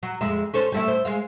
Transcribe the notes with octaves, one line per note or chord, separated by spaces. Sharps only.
F#3
F2 G#3 E5
C#4 A4 C5
G3 A3 E4
C5
G#3 C5 F5